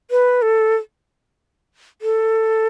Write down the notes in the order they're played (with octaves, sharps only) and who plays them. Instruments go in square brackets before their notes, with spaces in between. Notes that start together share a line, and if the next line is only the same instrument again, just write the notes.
[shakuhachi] B4
A4
A4